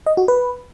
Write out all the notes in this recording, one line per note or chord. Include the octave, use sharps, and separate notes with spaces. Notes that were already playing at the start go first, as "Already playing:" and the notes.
D#5
F#4
B4